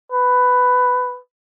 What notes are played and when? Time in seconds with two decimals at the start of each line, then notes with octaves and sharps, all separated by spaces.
0.12 B4